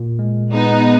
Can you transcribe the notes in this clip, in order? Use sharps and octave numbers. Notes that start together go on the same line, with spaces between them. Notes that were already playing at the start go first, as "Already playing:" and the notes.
Already playing: A#2
G#3
G#3 B3 D#4